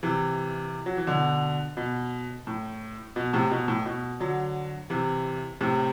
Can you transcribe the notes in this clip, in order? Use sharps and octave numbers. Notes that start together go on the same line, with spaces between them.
C3 E3
F#3
E3
B2 D3
B2
A2
B2
A2 C3
B2
A2
B2
D3 F#3
C3 E3
A2 C3